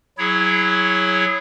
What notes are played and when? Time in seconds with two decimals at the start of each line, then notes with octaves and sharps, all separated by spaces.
0.18 F#3 E4 G#4 C#5